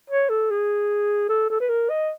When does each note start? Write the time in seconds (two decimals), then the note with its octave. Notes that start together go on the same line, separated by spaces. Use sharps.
0.10 C#5
0.30 A4
0.51 G#4
1.29 A4
1.50 A4
1.60 B4
1.69 A#4
1.90 D#5